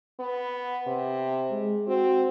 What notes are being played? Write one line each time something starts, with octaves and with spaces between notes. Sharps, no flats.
B3
C3
G#3
C4 F#4